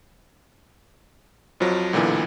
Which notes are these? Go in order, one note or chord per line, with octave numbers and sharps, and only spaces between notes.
F2 F3 F#3
B1 A#2 D3 E3